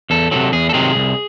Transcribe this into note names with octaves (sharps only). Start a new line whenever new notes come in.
E2 A4
C3 D#3 F#3 A4
E2 G#4
A4
C3 D#3 F#3 G#4
C2